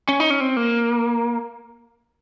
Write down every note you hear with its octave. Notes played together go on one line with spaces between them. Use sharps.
C#4
D#4
C#4
C4
A#3